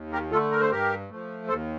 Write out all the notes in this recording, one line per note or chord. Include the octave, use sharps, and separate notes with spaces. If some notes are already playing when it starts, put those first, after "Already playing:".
Already playing: D#2
G4 A#4
D3 A3 F4 A4
A#4
C5
G2 G4 A#4
F3 A3
D#2 A4 C5